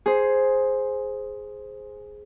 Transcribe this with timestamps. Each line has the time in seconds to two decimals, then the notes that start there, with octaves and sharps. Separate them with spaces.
0.06 G#4 C5